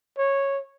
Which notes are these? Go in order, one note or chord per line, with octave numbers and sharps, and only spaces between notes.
C#5